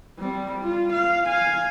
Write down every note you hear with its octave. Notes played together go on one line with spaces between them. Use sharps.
G3 C4
F4
F5
F5 G#5